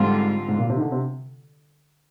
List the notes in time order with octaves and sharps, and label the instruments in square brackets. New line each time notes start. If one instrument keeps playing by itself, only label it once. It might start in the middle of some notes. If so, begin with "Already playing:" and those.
Already playing: [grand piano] G#2 [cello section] D3 G3 C4 F4
[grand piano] G#2
A#2
C3
D#3
D3
C3